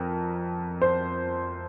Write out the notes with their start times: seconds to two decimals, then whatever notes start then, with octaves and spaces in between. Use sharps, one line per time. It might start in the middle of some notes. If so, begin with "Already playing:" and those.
Already playing: F2 A#4
0.82 C5